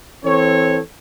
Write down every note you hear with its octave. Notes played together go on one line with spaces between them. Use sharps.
E3 C4 A4 C#5